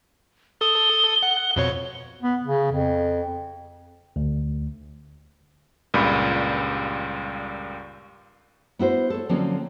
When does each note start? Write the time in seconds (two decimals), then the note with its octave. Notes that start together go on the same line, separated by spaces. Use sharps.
0.61 A4 D#6 G7
1.23 F#5
1.56 F2 B2 C#5
2.22 B3
2.43 C#3
2.72 F2
4.16 D2
5.94 C#2 G2 A#2 B5
8.79 B3 E4 F#4 C5
9.10 A4 C#5
9.29 D3 F3 F#3 A#3 C4 C#4